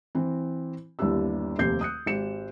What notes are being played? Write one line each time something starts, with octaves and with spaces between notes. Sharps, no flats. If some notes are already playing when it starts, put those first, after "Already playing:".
E3 C4
G1 D#2 D4 E4 G4 E6
F1 D#2 C3 G4 G6 C7
D#6 F#6 C#7
G#1 G4 C#7 E7